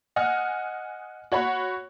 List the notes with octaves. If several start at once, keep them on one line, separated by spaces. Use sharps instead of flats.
D#5 F#5 G#5 F6
F#4 C#5 F#5 B5